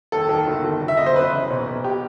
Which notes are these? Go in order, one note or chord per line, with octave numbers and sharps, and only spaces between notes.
D#2 A4
D#3
G1
G1
G1
E5
G1 D#5
C5
F#1 B4
E3
B1
B1
G4